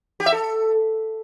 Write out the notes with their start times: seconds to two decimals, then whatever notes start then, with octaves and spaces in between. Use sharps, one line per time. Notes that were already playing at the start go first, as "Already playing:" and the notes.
0.20 G4
0.26 E5
0.32 A4